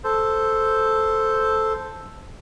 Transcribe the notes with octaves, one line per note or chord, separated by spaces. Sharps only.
A4 C5